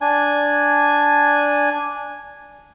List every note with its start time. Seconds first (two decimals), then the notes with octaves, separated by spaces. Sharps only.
0.01 D4 G#5